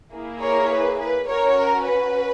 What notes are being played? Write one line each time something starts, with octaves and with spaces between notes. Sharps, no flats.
A#3 E4 G#4
A#4 C#5
B4
B4
C#4 F#4 A#4 C#5
A#4
B4